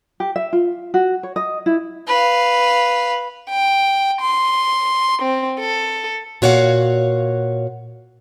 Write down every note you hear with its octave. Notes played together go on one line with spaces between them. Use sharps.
G4
E5
F4
F#4
C#5
D#5
E4
B4 F5
G5
C6
C4
A4
A#2 F#4 C#5 F5 F#5